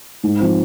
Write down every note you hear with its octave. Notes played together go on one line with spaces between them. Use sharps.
G#2
F3 C4